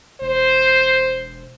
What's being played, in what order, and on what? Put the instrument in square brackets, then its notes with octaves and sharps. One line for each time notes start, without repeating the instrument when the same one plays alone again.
[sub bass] E1 [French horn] C5